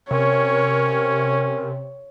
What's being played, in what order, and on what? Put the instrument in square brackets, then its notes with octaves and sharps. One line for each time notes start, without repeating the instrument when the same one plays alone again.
[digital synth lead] C3 [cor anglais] C#4 [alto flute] A#4 [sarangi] C#5